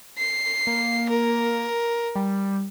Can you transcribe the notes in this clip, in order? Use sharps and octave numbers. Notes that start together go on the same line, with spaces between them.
C7
A#3
A#4
G3